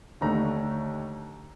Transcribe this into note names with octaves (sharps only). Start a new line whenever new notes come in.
D#2 D3 A3 D#4 A#5